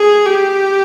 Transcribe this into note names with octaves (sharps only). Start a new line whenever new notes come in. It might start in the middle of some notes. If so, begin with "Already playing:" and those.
Already playing: G#4
G4